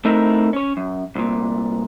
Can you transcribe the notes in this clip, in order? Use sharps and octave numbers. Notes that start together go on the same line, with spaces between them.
A3 C4 D#4 E4 A#4
C#4 C#5
F#2
C2 A#2